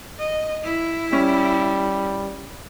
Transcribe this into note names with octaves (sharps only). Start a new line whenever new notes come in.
D#5
E4
G3 C#4